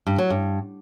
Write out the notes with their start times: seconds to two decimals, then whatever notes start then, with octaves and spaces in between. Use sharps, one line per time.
0.07 G2
0.18 F#3
0.30 G2